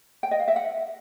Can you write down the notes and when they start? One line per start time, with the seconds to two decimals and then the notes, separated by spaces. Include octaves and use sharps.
0.23 G5
0.31 D#5
0.40 F5
0.48 E5
0.56 F#5